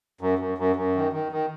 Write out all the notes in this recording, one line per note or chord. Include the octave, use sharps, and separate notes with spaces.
F#2
F#2
F#2
F#2
D#3
D#3
D#3